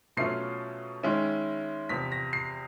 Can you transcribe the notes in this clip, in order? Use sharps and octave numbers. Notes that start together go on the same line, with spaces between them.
B2 F#3 A3 C#4 F4 C7
D#3 G#3 C#4 E4
E2 C3 F3 B6
A#6
C7